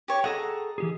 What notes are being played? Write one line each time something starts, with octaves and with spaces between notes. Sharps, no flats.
G4 C#5
G#4 A4 D#5 F#5 A#5
E3 G4 G#4